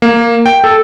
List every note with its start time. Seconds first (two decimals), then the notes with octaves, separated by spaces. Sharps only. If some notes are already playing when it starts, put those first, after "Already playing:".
0.02 A#3
0.46 G5
0.64 A4